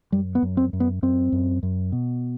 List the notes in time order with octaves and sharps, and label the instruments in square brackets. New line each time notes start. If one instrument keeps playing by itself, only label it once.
[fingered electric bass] F#2 G3
B3
F#2
C4
F#2
B3
F#2 C4
F#2
F#2
B2